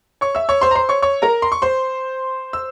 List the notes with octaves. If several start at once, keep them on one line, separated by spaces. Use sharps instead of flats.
C#5 C#6
E5 E6
C#5 C#6
C5 C6
A#5
C5 C6
C#5 C#6
C#5 C#6
A#4 A#5
C6
C#6
C5 C6
E6